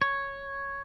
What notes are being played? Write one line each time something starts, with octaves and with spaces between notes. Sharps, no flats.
C#5